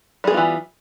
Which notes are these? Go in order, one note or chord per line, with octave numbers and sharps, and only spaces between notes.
E3 G3 B3 F4 G#4